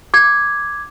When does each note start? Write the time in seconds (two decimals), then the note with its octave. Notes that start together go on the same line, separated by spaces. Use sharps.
0.14 D6 G#6